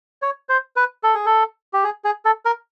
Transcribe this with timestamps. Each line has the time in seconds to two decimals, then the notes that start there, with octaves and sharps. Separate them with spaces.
0.22 C#5
0.49 C5
0.76 B4
1.03 A4
1.14 G#4
1.26 A4
1.73 G4
1.84 G#4
2.04 G#4
2.25 A4
2.45 A#4